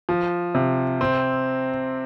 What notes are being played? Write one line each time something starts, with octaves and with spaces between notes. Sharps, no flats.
F3
C3
C4